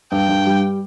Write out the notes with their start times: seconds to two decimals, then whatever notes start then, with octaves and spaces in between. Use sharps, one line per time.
0.12 G2 G5
0.29 G2
0.46 G3